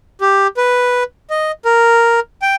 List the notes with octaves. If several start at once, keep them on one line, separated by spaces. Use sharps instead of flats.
G4
B4
D#5
A#4
G5